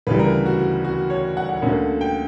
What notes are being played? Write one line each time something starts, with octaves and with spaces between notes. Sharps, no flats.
D2 C#3 E3 G3 B4
A#4
F#4
F#4
C#5
F#5
F#5
D2 D3 A#3 C#4
G5